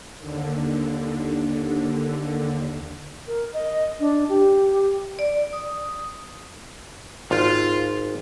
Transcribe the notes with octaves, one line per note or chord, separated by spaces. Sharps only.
D#2 D3
A#4
D#5
D4
G4
D5
D#6
G#1 F4